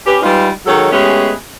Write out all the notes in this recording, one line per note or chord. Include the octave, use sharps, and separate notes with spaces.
C#4 G4 B4
G3 G#3 D#4 F4 B4
D#3 F#3 G#3 A4 C#5
G#3 A3 B3 C#4 G4 G#4